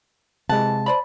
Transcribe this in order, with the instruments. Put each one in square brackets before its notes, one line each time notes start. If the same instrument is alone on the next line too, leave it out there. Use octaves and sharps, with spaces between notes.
[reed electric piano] C3 G#3 [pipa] E3 F#5 [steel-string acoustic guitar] A5
[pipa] C5 D5 B5